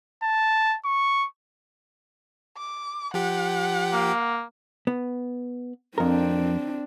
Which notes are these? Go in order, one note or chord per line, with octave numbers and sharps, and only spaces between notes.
A5
C#6
D6
F3 G4 F#5
A#3
B3
F2 C4 D4 A#4